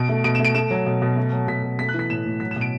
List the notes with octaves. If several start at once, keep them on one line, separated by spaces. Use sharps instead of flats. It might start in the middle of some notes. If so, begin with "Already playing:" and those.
Already playing: B2 D7
A3
B2 D7
A3 E7
D7
A3 E7
F#3
B2
B2
A3
F#3
B2 B6
B2
A3 B6
F#6
E3 B6
A2 E7
A2
F#3 B6
E7
B2
D7